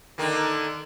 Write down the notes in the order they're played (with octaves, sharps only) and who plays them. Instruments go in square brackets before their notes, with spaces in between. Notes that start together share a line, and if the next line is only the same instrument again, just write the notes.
[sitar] D3 D#3 A#3